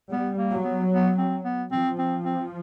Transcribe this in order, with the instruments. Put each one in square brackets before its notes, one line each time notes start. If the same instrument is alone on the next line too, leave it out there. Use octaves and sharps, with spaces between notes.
[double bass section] G3 [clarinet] B3
[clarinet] A#3
[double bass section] F#3
[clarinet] B3
B3
C4
B3
[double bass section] F3 [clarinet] C4
[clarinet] C4
C4